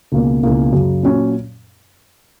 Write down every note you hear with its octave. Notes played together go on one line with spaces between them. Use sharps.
C#2 B2 A#3
C#2 B2 A#3 E4
F#2 C#3 F#3
A#2 F#3 C#4